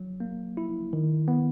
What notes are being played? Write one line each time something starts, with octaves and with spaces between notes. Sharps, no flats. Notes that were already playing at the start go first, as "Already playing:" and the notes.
Already playing: F#3
A#3
E4
D#3
B3